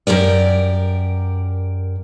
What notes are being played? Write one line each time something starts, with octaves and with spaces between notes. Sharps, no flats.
F#2 G4 A#4 D5